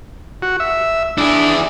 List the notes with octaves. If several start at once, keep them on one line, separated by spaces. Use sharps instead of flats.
F#4
E5
D4 E4 G#4